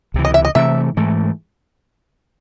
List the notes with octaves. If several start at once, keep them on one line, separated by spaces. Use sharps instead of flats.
C#2 C3 E3
D#5
E5
D#5
C3 E3 A3 E5
G#2 E3 A3